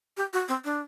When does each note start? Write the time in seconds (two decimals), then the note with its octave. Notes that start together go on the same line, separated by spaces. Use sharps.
0.17 G4
0.33 F#4
0.48 C4
0.65 D4